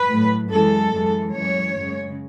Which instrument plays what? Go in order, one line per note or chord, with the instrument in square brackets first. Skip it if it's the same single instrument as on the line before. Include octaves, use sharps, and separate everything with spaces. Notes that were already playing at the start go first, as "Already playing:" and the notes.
Already playing: [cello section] B4
A2 F#3
F#2 E3 G#3 A4
F#2 E3 G#3
F#2 E3 G#3 C#5
F#2 C#3 G#3